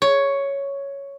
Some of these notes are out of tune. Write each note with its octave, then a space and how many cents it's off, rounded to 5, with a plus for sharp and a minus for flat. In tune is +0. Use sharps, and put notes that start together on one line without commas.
C#5 +5